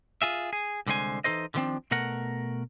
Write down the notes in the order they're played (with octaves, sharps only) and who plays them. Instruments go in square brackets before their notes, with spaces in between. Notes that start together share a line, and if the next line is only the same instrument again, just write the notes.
[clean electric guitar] F4 G#4 E5
G#4
C2 D3 G#3 C5 G#5
E3 F3 D#4 A4 C5 D#5
D3 D#3 F3 A3 C4 D4
B2 A3 A#4 F#5